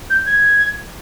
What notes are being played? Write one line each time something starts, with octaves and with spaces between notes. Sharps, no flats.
G6
G#6